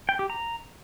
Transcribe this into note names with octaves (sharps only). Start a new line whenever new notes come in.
G5
G4
A#5